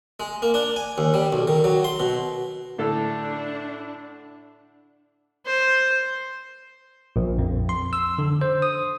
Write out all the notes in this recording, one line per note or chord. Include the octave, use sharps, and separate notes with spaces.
G#3
A#3
D4
G#5
D#2
G3
B1
D#3
F#3
C6
B2
A2 D3 D4 A4
C5
A#1
F2
C6
E6
D3
C5
D#6